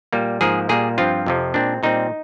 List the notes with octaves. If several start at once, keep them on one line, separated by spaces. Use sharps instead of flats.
A#2 G3 A#3
G#2 F3 A#3 G#4
A#2 G3 A#3 G#4
G2 F3 C4 F4
F2 C3 F3
A#2 G#3 C4 D4
A#2 G3 C4 D#4